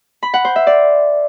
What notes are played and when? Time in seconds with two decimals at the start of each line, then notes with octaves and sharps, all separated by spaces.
0.23 B5
0.34 F#5
0.45 C5
0.56 E5
0.67 D5